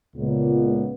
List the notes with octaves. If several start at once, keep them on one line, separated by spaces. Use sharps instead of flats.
C#2 A#2 B3